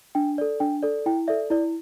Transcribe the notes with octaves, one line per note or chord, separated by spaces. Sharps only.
D4 G5
A4 D5
D4 G5
A4 D5
E4 G5
A4 D5 E5
E4 D5